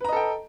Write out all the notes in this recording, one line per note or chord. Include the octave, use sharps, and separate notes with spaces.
A4 B4 D#5 G5 A#5